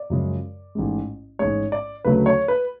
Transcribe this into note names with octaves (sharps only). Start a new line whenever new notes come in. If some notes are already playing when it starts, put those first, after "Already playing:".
Already playing: D5
F#2 C#3 F3 G#3
A1 G#2 G#3
A1 G#2 G#3 C#5
D5
D2 C#3 F#3 A3 B4
C#5
B4